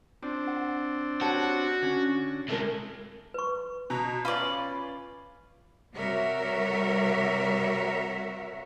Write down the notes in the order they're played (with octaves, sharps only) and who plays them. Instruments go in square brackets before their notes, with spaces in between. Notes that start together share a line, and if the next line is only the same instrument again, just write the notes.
[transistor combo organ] C4 D4 [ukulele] F4
[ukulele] F#5
[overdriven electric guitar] F#4 [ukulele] G4 C#5 A5
[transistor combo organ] D3 [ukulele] C#4 C#5
[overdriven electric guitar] C3 G#3 [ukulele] A4 A#4 C#5
[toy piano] B4 C#6
[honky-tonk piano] B2 A#5
[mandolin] C#4 B4 D5 [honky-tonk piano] F4 [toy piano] B5
[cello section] C3 G3 F#4 A#4 C#5 E5